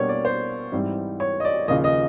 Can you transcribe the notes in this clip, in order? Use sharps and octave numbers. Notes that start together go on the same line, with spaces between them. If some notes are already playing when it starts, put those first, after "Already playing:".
Already playing: B2 G3 A#3 D4 C#5
D5
C5
G#2 E3 G3 C4 E4
C#5
D#5
D5
D#2 C#3 F3 D#5
D#5